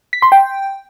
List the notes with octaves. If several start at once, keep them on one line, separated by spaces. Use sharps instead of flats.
B6
C6
G5